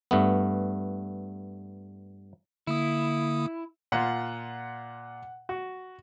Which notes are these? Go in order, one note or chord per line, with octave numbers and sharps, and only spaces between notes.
G2 A3 B3
D3 A#3 E4 D#6
A#2 F4 F#5
F#4